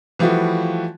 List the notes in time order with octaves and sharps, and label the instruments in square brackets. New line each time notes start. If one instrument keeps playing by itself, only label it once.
[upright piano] E3 F3 G3 A3 E4 F#4